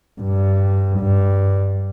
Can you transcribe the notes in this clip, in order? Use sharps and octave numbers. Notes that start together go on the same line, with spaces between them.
G2
G2